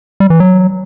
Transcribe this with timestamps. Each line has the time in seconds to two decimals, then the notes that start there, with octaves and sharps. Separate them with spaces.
0.20 G3
0.30 E3
0.40 F#3